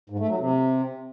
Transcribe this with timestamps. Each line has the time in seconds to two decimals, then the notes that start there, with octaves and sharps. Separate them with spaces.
0.10 G#2
0.19 A3
0.29 F#3
0.38 C3